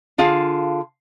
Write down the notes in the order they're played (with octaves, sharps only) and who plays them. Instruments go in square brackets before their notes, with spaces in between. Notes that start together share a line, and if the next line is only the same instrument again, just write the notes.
[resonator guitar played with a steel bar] D3 F4 G#4 F5 A5